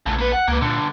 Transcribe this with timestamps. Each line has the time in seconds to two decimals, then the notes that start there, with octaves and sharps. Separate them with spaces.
0.06 A#1 C#3 A3
0.18 A#3 B4
0.32 F#5
0.48 C#2 A#3 B4
0.61 G2 A#2 D3